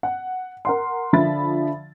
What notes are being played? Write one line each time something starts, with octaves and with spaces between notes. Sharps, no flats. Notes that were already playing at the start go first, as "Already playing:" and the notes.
F#5
A#4 F#5 C6
D3 F3 E5 B5 A6